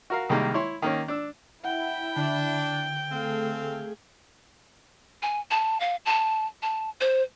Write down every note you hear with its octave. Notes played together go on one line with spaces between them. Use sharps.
F#4 A#4 F5
C2 D#3 G3 G#3 A#3
E4 C#5 C6
D#3 A#3 C#4
D4 E6
E4 F#5 G5
D3 D4
A3 C4 G#4 A4 F5
G#5
A5
F5
A5
A5
C5